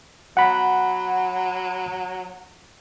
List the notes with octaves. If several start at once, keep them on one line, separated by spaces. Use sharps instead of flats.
F#3 F#5 B5